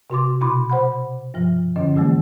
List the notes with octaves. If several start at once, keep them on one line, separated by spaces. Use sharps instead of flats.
C3 F#4 C6 D6
B2 E4 B5 C6 D6
C5 F#5 B5
G2 F3
F#2 D3 C#4 D#5
F#2 A2 D3 E3 G#3 A#3